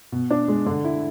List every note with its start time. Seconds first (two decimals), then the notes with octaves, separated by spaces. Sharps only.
0.12 B2
0.31 D4
0.48 G#3
0.66 D3
0.84 E4